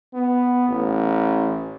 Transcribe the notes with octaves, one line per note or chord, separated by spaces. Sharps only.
B3
A1